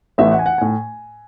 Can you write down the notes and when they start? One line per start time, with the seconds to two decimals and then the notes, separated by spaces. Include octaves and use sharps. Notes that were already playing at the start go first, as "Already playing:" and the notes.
0.18 A1 A2 E3 E5
0.31 F#5
0.39 G#5
0.46 F#5
0.58 A2 G#5